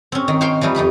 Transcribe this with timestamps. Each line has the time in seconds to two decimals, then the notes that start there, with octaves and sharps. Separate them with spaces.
0.12 C4 C#4
0.28 D#3
0.41 C5 C#5 F5 G5 C6
0.61 E3 F3 G3 D#4
0.75 F2 D#4 G4 B5